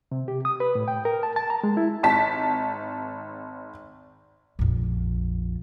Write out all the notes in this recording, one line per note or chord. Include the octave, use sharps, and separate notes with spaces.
C3
G4
D#6
B4
A2
G5
A#4
A5
A5
A#5
G#3
E4
G#1 A5 B6
A#1 F2